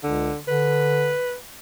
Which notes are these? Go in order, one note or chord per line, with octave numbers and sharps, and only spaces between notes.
C#2 D3
D3 B4